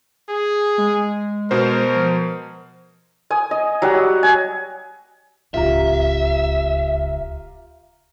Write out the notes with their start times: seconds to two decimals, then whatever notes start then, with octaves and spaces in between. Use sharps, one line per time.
0.29 G#4
0.78 G#3
1.51 B2 A#4 C5
1.95 F3
3.30 G#5 D#6
3.51 D#5
3.82 F#3 G3 F#5
4.23 G#5
5.54 D1 C#2 F4 G4 E5 A#5